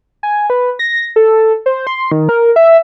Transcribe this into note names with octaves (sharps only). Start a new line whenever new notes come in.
G#5
B4
A#6
A4
C5
C6
D#3
A#4
E5